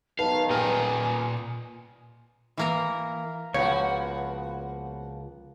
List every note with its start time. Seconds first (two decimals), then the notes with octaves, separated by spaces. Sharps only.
0.19 B1 D#3 B4 F5 A5
0.50 A#2 B4 D#5 G5 G#5 F6
2.57 E3 A#3 A#4
3.54 C#2 F3 A#3 B3 F#4 C#5